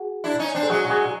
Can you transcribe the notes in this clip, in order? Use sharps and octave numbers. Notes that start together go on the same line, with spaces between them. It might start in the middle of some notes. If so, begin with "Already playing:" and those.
Already playing: F#4 G#4
D4 E4
C#4 D#4
C4 D4
A4
F#3 G#3 F#4 G#4
F#4 G#4